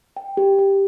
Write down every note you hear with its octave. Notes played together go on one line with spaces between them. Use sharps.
G5
G4
G4